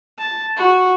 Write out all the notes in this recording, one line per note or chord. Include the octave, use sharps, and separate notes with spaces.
A5
F#4